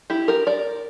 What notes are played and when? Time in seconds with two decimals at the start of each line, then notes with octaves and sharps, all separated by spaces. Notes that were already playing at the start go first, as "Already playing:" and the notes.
0.10 E4 G4
0.28 G4 A#4
0.47 A#4 D5